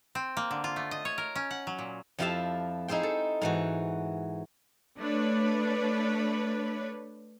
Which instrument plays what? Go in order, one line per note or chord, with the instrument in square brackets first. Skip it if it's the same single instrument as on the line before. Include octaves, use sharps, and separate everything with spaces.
[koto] C4
A#3
D3
F4
A3
D#5
C#5
A#4
C#4
F#5
F#3
A#2
[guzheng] F2 F3 E4 G4 F5 A5
D#4 E4 G#4 C5 G5
A4
G#2 E3 F#4
[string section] A3 D4 B4 C#5